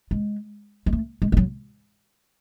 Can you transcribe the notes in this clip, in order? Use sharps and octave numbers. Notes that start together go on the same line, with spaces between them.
G#3
G#3
A3
G#3
G#3
F#3